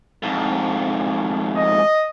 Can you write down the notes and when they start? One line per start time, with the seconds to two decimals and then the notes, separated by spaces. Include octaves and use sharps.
0.23 F2 G#2
1.56 D#5